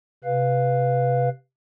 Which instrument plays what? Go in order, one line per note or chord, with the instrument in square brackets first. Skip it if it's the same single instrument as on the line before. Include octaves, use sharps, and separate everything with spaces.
[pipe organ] C3 B4 F5